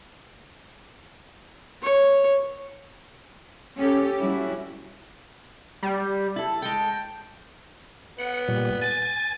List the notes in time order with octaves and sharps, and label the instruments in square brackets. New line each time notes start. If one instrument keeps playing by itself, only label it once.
[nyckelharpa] C#5
[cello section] C#4 G4 A4
G3 C#4 E4 F#4
[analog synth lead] G3
[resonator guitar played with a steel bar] E4 A4 [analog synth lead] A6
[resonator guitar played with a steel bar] G#3 A4 [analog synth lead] G5
[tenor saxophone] B3 [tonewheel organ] F#5
[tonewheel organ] A#2 G3
[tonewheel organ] G#5 [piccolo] A6